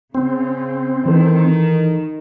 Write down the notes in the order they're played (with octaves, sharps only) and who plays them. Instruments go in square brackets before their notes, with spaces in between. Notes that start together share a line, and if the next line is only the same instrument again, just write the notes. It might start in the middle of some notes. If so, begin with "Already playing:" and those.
[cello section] C#3 [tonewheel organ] C4
[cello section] D#3 [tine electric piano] E3 A4